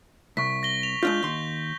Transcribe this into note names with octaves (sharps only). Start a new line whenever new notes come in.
C2 C#6 B6
A#6 G7
F7
G#3 D4 F4 G6
D#2 C6